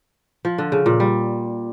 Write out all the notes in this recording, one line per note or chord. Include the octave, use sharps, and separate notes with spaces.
F3
D3
C#3
A#2
G3